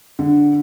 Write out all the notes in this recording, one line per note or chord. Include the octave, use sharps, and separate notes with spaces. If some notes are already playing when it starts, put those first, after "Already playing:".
D3